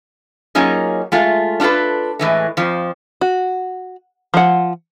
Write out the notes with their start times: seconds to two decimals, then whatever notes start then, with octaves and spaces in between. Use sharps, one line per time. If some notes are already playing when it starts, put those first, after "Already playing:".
0.55 F#3 A#3 C#4 D#4 F4 G#4
1.12 G#3 A3 F4
1.60 D4 F4 F#4 A4 B4
2.19 A2 E3 G#3
2.57 F2 F3
3.21 F#4
4.34 F3 F#5